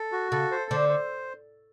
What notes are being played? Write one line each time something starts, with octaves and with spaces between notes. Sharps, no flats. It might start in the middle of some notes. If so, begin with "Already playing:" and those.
Already playing: A4
F#4
C#3 A4
C5
D3 C5
C5